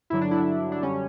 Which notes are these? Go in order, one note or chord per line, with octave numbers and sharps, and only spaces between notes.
G2 D3 F#3 E4
D4
E4
D4
F#2 D3 G3 C#4